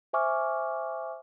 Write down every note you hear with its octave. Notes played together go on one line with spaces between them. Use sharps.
C5 E5 G#5 C#6 D6 F6